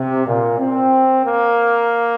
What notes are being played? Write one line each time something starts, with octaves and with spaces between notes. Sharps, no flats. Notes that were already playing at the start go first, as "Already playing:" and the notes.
Already playing: C3
A#2
C4
A#3